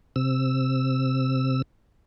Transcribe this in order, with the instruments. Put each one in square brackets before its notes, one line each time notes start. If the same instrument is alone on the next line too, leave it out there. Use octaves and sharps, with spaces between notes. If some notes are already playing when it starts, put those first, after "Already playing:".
[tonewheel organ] C3 E6